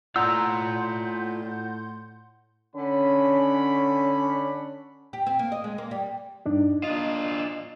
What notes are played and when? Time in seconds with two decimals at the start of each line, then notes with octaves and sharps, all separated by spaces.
0.16 A2 F4 D5 F#5 A#5 C6 E6 G6
2.76 D3 C#4 B5
5.13 G4
5.26 C4
5.39 A#3
5.52 D#5
5.64 G#3
5.78 A#3
5.91 G3
6.46 G2 D4 D#4
6.83 D4 F4 D#5